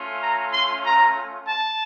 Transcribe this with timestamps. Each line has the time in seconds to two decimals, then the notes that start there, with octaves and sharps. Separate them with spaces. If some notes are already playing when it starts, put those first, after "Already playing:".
Already playing: A3 C#4 F4
0.21 A#5
0.52 C6
0.83 A#5
1.46 A5